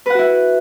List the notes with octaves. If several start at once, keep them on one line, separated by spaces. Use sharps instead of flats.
E4 F#4 B4 F#5